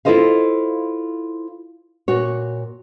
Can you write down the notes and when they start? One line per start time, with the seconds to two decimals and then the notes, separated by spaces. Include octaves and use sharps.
0.05 E4 F4 A4 C5 D#5 F5
2.08 A#2 F#4 C#5